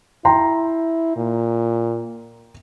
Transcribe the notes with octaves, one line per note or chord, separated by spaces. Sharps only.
E4 G5 A#5 C6
A#2